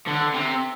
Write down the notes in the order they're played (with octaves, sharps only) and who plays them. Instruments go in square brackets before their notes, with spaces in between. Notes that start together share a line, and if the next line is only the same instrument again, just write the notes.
[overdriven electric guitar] D3
C3